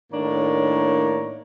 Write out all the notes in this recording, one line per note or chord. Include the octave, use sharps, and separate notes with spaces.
A2 D#3 A#3 D4 C#5 A#5